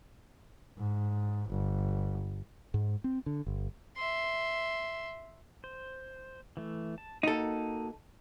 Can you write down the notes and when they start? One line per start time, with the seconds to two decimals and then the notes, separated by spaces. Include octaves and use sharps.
0.78 G#2
1.50 G1
2.74 G#2
3.04 C4
3.26 D3
3.47 G1
3.96 E5 C6
5.64 C5
6.57 E3 A3
6.98 A5
7.23 A#3 D#4 F#4 A4